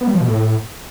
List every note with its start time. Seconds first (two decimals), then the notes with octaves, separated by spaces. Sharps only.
0.01 B3
0.07 G3
0.14 F3
0.21 B2
0.27 A2